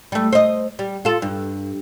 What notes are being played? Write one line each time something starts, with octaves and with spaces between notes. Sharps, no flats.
G3 A3
C5 D#5
G3
F4 A4
G2